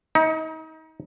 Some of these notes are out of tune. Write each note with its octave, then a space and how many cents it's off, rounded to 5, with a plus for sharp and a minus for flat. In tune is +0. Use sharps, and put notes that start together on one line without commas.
D#4 +30